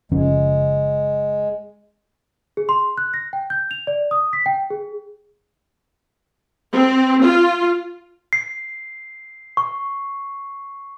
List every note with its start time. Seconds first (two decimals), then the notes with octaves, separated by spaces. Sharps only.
0.12 F#1 F3 G#3 C#4
2.57 G#4
2.69 C6
2.98 F#6
3.14 A#6
3.33 G5
3.50 G6
3.71 F7
3.87 D5
4.11 D#6
4.33 B6
4.46 G5
4.70 G#4
6.73 C4
7.23 F4
8.33 C7
9.57 C#6